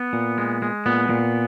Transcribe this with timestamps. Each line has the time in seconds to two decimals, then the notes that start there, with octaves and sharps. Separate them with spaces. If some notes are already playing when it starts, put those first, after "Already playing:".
Already playing: B3
0.13 A#2
0.38 G#3
0.62 G#3
0.86 A#2 B3
1.10 A#2